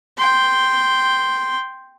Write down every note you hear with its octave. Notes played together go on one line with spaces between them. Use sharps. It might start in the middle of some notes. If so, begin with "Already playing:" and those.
G5 C6